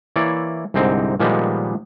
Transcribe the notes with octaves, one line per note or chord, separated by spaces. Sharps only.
E3 A#3 E4 C#5 D5
C2 G#2 D3 C4 D#4
A#2 D#3 F3 G3 G#3 B3